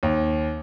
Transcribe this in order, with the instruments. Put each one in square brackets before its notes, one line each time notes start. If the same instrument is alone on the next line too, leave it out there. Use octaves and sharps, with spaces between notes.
[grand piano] D#2